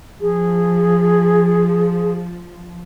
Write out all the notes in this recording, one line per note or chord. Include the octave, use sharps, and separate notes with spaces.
F3 G#4